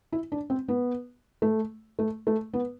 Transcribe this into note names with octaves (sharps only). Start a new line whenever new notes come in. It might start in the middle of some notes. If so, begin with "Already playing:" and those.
E4
D4
C4
B3
A3
A3
A3
B3